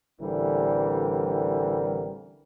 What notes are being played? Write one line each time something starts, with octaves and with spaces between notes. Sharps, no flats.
A1 D3 E3 G3 C4 A#4